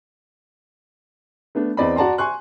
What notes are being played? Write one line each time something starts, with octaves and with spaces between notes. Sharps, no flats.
A3 B3 D4
E2 B3 C4 D5 D#5 B5
F#4 D5 A5 A#5 C6
G#5 C6 C#6 F#6